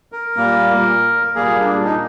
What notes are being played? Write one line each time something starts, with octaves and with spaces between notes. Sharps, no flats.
A#4
A#2 G3 A#3
A#2 G3 A#3 G#4
D4
D#4